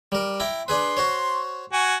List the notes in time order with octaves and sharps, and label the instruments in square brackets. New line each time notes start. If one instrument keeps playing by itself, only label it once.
[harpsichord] G3 A#4
E4 G5 A#5
[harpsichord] D4 G#4 B4 [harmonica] C6
[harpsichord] F#4 C5 C#5
[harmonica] F#4 G#5